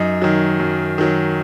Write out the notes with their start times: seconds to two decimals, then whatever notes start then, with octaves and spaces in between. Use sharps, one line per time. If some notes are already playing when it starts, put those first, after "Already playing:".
Already playing: F#2 D#4
0.22 D#3 F#3
0.60 F#2
0.98 D#3 F#3